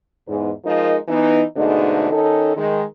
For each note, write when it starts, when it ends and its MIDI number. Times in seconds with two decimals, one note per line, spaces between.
0.26 0.50 40
0.26 0.50 44
0.65 0.97 53
0.65 0.97 56
0.65 0.97 63
0.65 0.97 70
1.08 1.41 52
1.08 1.41 59
1.08 1.41 63
1.56 2.10 44
1.56 2.10 47
1.56 2.10 50
1.56 2.10 56
1.56 2.10 57
1.56 2.10 63
2.10 2.56 51
2.10 2.56 61
2.10 2.56 63
2.10 2.56 69
2.57 2.83 51
2.57 2.83 56